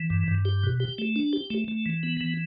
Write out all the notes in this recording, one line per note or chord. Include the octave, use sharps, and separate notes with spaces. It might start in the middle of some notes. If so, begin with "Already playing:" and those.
Already playing: E3
G2
G2
G4
B2
G4
A3
D4
G4
A3
A3
E3
B3
E3